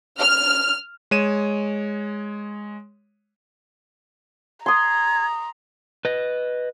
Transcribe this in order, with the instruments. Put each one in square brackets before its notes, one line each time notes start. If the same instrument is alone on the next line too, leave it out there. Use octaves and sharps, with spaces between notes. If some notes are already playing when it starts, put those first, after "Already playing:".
[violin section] F6
[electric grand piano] G#3 C#5 D#7 E7
[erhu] A#5 [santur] C6 D#6 [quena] G#6
[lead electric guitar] B4 D#5